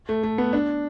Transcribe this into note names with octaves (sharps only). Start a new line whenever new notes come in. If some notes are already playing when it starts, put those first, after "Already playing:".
A3
A3
B3
D4